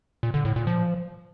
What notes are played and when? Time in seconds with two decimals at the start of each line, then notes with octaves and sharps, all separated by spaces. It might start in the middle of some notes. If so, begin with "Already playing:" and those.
0.23 A#2
0.34 D3
0.45 A2
0.56 A#2
0.67 F3